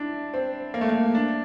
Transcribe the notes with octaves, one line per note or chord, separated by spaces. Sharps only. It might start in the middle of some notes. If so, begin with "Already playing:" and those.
Already playing: D4 E4
C4
A#3
A3
A#3
D4